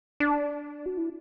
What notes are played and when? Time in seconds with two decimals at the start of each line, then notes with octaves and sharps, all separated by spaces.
0.20 D4
0.86 F#4
0.97 E4